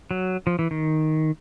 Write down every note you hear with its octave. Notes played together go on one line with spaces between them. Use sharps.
F#3
F3
E3
D#3